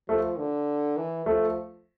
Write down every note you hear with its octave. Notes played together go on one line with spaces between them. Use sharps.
F3 A3
D3
E3
F3 A3